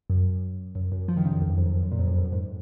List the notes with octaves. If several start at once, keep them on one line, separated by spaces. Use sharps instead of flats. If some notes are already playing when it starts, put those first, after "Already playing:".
F#2
F#2
F#2
F3
D#3
C#3
F#2
F2
F#2
F2
F#2
F2
F#2
A#2
F2
F#2
F2
F#2
G#2